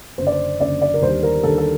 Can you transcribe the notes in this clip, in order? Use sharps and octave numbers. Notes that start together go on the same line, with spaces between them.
F#1 F#2 D3 C5
D5
C5
F#1 F#2 D3 D5
D5
A#4
D#2 D3 G3 C5
A#4
D#2 D3 G3 A4
A4